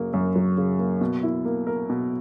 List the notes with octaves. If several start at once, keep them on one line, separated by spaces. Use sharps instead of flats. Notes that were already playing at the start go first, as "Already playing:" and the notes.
Already playing: F#2 C#3 F#3 A#3
F#2
F#3
C#3
A#3
B2
E4
A#3
A#4
B2